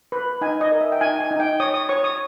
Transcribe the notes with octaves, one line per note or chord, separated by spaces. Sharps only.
B4
D#4 G#5
D#5
A#4
E5
G5
D#4 G#5
G#5
D#4
G5
C#5 D#6
D#6
C#5 C#6
D#6